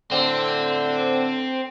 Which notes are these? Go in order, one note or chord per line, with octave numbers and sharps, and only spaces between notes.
A2 D3 C4